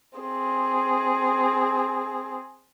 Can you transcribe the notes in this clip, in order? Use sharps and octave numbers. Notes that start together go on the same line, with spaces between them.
C4 G#4